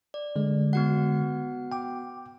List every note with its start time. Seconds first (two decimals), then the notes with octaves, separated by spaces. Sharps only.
0.14 D5
0.36 D3 G#3
0.73 B3 F#4 F#5
1.72 G5 D6